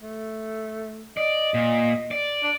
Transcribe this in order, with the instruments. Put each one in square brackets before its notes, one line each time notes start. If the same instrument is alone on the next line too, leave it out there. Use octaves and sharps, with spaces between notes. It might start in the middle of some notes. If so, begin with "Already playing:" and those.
[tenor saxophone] A3
[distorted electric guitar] D5 [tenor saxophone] D#5
[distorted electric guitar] A#2
D5
[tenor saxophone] D4